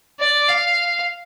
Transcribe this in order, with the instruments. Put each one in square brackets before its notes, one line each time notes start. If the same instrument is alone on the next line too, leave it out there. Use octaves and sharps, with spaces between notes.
[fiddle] D5
F5